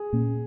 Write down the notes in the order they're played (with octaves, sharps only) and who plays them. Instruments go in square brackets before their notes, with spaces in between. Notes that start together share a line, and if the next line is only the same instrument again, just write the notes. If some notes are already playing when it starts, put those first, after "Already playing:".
Already playing: [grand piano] G#4
[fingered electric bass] A#2 A#3 C#4